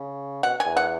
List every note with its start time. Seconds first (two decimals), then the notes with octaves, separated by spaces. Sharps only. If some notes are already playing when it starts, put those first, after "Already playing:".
Already playing: C#3
0.43 B2 F#5
0.60 G#5
0.65 E2
0.77 F#5